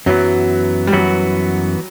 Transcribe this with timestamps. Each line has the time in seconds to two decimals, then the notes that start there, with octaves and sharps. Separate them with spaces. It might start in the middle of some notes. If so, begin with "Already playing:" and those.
0.06 F#2 E3 F#3 B3
0.87 G3
0.93 F#2 E3 F#3 B3 F#4